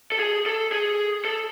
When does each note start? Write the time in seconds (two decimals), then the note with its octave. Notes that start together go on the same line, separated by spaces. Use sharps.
0.12 A4
0.19 G#4
0.46 A4
0.72 G#4
1.25 A4